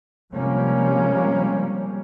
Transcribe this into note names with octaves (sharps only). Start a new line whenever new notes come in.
C3 F3 G3 G#3 A#3 C#4